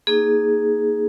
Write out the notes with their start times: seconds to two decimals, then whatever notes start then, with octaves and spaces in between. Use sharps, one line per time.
0.07 A#3 D#4 G#4